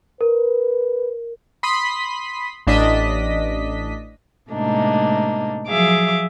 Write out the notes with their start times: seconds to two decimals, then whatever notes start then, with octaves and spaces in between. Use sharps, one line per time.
0.21 A#4 B4
1.63 B5 C6 D#6 B6
2.67 A1 D4 D#5 B6
4.50 A2 C3 G#3 A#3 D4 D#4
5.67 F3 F#3 G#4 E5 F5 D6